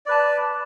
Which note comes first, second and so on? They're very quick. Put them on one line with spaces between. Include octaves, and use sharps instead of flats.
D5 B4 A5